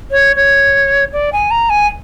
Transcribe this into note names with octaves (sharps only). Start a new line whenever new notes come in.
C#5
C#5
D5
G#5
A#5
G#5